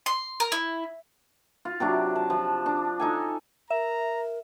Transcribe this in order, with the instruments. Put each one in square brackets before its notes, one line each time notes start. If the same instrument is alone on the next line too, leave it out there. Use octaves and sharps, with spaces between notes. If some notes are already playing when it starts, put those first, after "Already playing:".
[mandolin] C6
A#4
E4
[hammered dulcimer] F4
C3 F#3 D4 E4
A5
F3
D4
D#4 A4 G#5
[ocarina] A#4 [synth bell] E5 [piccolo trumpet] A#5